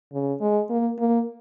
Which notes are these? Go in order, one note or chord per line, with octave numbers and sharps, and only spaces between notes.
C#3
G#3
A#3
A#3